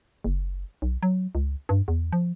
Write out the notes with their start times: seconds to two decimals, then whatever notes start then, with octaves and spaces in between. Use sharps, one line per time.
0.24 F#1
0.82 B1
1.03 F#3
1.35 C#2
1.69 G2
1.88 E2
2.12 F3